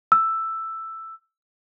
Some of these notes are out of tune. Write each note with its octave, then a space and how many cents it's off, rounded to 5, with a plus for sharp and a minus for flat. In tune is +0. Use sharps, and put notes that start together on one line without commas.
E6 +5